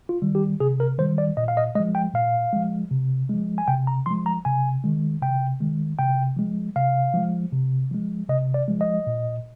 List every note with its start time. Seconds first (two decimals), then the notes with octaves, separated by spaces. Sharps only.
0.09 F4
0.22 D#3 G3
0.35 G4
0.60 C3 G#4
0.80 A#4
0.98 D#3 G3 C5
1.18 D5
1.37 A#2 D#5
1.48 F5
1.57 D#5
1.75 G#3 D#5
1.80 F3
1.95 G5
2.14 A#2 F5
2.53 F3 G#3
2.91 C3
3.29 F3 G#3
3.58 G#5
3.68 C3 G5
3.87 A#5
4.06 F3 G#3 C6
4.26 A#5
4.45 C3 G#5
4.84 D#3 G#3
5.22 C3 G5
5.61 D#3 G#3
5.99 C3 G5
6.37 F3 G#3
6.76 C3 F5
7.14 F3 G#3
7.52 C3
7.91 F3 G#3
8.29 C3 D#5
8.54 D5
8.68 F3 G#3
8.81 D#5
9.07 A#2